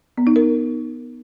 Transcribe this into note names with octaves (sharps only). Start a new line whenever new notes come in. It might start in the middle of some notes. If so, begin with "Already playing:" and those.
B3
D#4
A#4